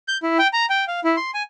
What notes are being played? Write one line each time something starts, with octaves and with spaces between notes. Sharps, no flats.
G6
E4
G5
A#5
G5
F5
E4
C6
G#5